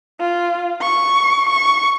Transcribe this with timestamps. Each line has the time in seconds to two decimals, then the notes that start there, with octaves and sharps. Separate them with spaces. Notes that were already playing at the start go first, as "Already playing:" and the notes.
0.20 F4
0.81 C#6
1.49 C#6